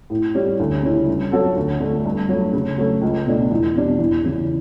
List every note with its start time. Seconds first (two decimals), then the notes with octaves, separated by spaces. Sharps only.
0.10 A2
0.34 G3 C#4
0.60 D2
0.83 C#3 G3 C#4 E4
1.07 G2
1.32 F#3 C#4 F#4 A4
1.56 D2
1.80 D3 A3
2.06 G2
2.29 F#3 A3
2.53 C#3
2.78 F#3 A3
3.02 C#2
3.26 B2 A3 D4
3.51 E2
3.75 B2 G3 D4
3.99 E2
4.24 C#3 E3